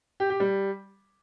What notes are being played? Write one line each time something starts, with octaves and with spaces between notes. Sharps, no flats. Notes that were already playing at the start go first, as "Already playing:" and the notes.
G4
G4
G3